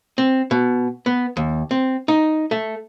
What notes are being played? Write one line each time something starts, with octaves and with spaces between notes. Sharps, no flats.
C4
B2
B3
D#2
C4
D#4
A3